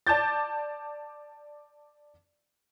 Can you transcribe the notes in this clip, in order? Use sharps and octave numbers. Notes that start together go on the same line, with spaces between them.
D5 A5 D6 G6 A6